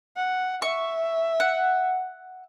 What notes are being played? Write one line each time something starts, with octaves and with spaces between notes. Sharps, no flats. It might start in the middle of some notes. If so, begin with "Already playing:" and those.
F#5
E5 C#6
F#5